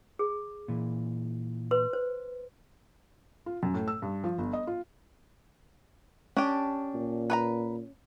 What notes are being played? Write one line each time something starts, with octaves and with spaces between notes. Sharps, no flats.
G#4
A#2 E3
B4 C6
C5
F4
F#2
A2
E6
G2
F3
G1
D#5
F4
C#4 D4 G4
A#2
B4 C#5 A#5